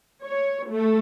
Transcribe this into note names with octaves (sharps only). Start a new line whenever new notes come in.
C#5
A3